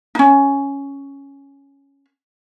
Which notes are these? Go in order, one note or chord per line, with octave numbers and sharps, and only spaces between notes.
C#4 D#4